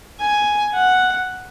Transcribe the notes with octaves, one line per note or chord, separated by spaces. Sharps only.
G#5
F#5